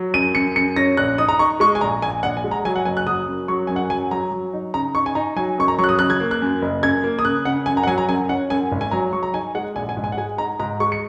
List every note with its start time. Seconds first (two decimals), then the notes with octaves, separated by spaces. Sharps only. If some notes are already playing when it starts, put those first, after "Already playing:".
Already playing: F#3
0.14 F#2 D#7
0.35 F#2 C#7
0.55 F#2 C#7
0.76 C#4 A#6
0.97 A#1 F#6
1.18 D#4 D#6
1.29 A#5
1.39 D#4 C#6
1.60 G#3 C#6
1.75 G#5
1.81 A#1 A#5
2.02 A#1 G#5
2.23 A#1 F#5
2.37 G#5
2.44 G#3
2.51 A#5
2.65 F#3 G#5
2.76 F#5
2.85 F#1 G#5
2.97 F#6
3.07 F#3 D#6
3.27 F#2
3.48 F#3 C#6
3.67 F#2 G#5
3.76 F#5
3.90 F#3 G#5
4.11 F#3 A#5
4.32 F#3
4.53 D#4
4.74 C#3 A#5
4.95 D#4 C#6
5.06 G#5
5.15 D#4 A#5
5.36 F#3 G#5
5.58 F#2 C#6
5.68 A#5
5.78 F#3 C#6
5.84 F#6
5.89 D#6
5.99 C#3 F#6
6.10 G#6
6.20 A#3
6.31 F#6
6.42 F#2
6.62 F#1
6.83 F#2 G#6
7.04 A#3
7.19 D#6
7.24 C#3 F#6
7.45 C#3 F#5
7.66 F#2 G#5
7.77 A#5
7.83 F#5
7.87 F#3 G#5
7.98 A#5
8.08 F#2 G#5
8.29 C#4 F#5
8.50 F#2 G#5
8.72 G#1
8.81 G#5
8.91 F#3 A#5
9.13 F#3 C#6
9.23 A#5
9.34 D#4 G#5
9.55 G#3 F#5
9.75 A#1 G#5
9.89 G#5
9.97 G#2
10.04 G#5
10.12 F#5
10.18 G#3 G#5
10.38 D#4 A#5
10.60 G#2 A#5
10.80 G#3 C#6
10.92 C#7